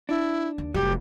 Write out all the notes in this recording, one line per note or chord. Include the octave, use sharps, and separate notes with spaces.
D4 E4
D#2
F1 F#3 G3 G4